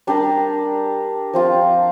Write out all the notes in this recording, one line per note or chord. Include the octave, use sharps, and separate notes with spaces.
G3 D4 G4 A#4
F3 C4 F4